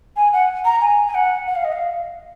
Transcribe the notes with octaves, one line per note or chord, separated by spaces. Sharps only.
G#5
F#5
A#5
G#5
G#5
F#5
F#5
F5
D#5
F5